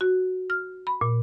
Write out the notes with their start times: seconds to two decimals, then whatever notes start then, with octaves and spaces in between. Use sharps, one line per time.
0.01 F#4
0.50 F6
0.87 B5
1.01 A#2